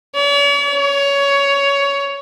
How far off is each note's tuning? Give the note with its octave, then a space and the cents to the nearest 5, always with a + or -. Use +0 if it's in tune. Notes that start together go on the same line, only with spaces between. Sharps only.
C#5 +45
C#5 +15